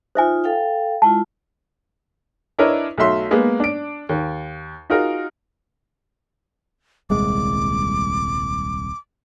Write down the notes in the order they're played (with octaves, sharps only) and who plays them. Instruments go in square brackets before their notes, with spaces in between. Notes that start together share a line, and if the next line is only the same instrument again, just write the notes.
[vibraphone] D#4 F4 [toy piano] C5 E5 G#5
[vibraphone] A4 F5 G5
[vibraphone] G#3 E4 F4 [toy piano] A5
[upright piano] D4 E4 A#4 B4 C#5 D#5
B1 A3 F#4 E5 C6
G#3 A#3 B3
D4 D7
D#2
D#4 F4 F#4 G#4 A#4
[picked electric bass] D#1 C2 G#3 [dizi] D6